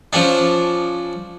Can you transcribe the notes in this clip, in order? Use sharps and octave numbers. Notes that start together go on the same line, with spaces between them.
F3 C#4 D4